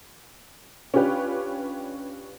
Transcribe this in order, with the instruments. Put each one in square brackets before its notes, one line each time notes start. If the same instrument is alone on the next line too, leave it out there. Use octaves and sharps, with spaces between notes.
[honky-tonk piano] C#4 D4 F4 G4 B4